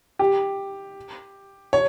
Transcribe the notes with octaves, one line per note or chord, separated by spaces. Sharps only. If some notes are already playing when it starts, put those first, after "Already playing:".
G4
C#5